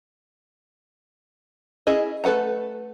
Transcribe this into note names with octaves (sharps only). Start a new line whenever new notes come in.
C#4 E4 G#4 D#5
A3 A4 B4 F#5 A#5